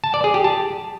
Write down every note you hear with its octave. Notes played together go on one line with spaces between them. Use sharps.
A5
D5
G#4
G4
A5